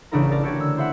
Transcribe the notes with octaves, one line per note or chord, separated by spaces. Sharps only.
A1 C#3 D4 E4 A#4 A#5
A#4 D5 A5
E4 F#4 G4 C#5 D5
D3 E6
C4 E4 C5 E5 F#5